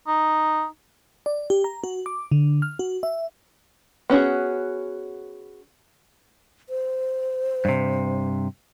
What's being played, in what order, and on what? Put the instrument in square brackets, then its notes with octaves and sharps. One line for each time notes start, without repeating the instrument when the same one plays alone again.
[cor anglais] D#4
[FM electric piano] D5
G4
A#5
F#4
D6
D3
F6
F#4
E5
[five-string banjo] B3 C#4 F#4 G#4
[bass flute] C5
[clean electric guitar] G2 C3